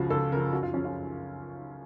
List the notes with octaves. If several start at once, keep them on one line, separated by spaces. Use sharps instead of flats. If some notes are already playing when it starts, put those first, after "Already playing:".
Already playing: C#2 C#3 F3 F4 F#4
C#2 A4
C#3 F3 A#4
F#2 F#4
F4
C#3 F3 C#4
F4